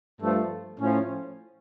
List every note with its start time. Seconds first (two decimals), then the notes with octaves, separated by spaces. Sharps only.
0.21 G2 F3 A3
0.80 A2 F3 C#4